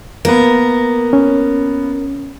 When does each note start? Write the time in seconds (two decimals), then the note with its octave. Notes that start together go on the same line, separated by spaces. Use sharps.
0.25 A#3 B3 A#4
1.13 C#4